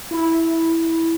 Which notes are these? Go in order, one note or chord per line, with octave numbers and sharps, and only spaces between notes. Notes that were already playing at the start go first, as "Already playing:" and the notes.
E4